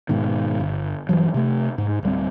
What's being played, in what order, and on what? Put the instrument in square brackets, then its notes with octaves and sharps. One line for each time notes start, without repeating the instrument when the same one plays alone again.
[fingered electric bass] G#2 B2 D#3
G1
G2 E3 F#3
C3 A3
G#2
D1 G3 C4